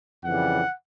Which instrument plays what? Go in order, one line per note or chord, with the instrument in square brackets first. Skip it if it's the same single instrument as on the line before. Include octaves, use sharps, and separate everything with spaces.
[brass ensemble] F2 C#3 E3 G3 F#5